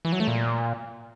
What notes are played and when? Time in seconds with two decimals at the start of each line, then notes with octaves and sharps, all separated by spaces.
0.05 E3
0.12 F#3
0.20 A3
0.28 A#2